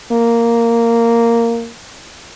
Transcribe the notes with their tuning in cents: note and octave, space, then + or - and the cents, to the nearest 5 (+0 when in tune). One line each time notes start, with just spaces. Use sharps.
A#3 -5